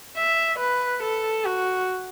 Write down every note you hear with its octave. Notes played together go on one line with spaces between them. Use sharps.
E5
B4
A4
F#4